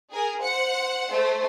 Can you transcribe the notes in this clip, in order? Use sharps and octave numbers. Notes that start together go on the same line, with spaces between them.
G#4 A#4
C5 F#5 C#7
A3 C5